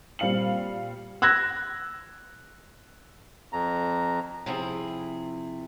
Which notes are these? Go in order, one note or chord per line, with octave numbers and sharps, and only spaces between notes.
A#2 G3 C4 F5 C#7 F#7
E6 F#6 G#6 A#6
F2 A#5
C3 F3 E4 G#4